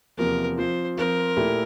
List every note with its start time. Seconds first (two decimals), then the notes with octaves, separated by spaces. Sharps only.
0.17 E2 C3 F3 A#3 A#4
0.57 F3 C4 F4 C5
0.97 F3 C4 F4 A#4
1.36 A#2 A3 E4 G4